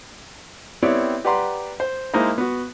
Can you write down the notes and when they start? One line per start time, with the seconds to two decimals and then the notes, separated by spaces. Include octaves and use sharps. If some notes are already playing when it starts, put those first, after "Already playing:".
0.83 B3 C4 E4 G4 C#5 D5
1.25 G4 B4 D5 F#5 A#5 C6
1.80 C5
2.14 G#3 A#3 D#4 E4 C5
2.38 B3 F#4